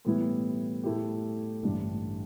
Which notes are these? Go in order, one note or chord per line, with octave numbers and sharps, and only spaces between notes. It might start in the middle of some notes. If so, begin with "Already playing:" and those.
A2 E3 G3 B3 E4
A2 A3 E4 G4
A1 G2 D3 G3 D4